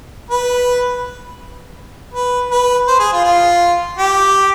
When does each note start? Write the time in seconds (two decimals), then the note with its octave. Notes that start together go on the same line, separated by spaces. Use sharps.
0.30 B4
2.14 B4
2.51 B4
2.88 C5
3.00 G#4
3.12 F4
3.24 F4
3.98 G4